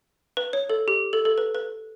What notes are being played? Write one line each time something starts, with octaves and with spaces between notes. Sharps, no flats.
B4
C#5
A4
G4
A4
A4
B4
B4